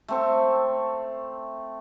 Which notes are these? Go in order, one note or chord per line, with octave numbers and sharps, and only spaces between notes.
A3 C4 C#6